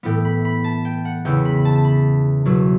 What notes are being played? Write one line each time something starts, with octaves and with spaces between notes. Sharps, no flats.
A2 E3 B3 E4 G5
B5
B5
A5
G5
F#5
E2 C#3 E3 B3 E4 G5
B5
B5
A5
A5
B5
E2 B2 F#3